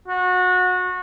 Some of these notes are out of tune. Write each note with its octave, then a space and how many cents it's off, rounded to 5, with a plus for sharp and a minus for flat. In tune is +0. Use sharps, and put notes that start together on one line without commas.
F#4 -25